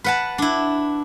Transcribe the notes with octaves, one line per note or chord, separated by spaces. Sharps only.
B4 F#5 A5
D4 E4